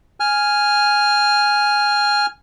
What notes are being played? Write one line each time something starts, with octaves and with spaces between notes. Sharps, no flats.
G#5 F6